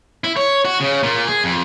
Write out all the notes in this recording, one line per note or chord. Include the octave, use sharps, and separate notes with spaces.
E4
C#5
F#4
C#3
A#2
G#4
F2